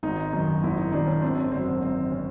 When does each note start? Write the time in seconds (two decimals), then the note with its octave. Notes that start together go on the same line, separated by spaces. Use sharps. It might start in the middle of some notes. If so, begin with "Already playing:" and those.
0.03 G#1 D#4
0.33 F#2 D#3
0.63 G#1 E4
0.77 D#4
0.92 F#2 D#3 D4
1.07 C#4
1.22 G#1 C4
1.52 F#2 D3 C4
1.82 G#1 C4
2.12 D3 C#4